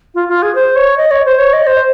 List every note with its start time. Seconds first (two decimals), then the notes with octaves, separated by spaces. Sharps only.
0.15 F4
0.29 F4
0.42 G#4
0.55 C5
0.76 C#5
0.98 D#5
1.11 C#5
1.25 C5
1.39 C#5
1.53 D#5
1.67 C5